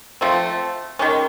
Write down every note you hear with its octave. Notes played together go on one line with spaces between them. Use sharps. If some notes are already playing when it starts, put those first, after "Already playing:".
F3 A3 C4
D#3 G#3 C#4 G4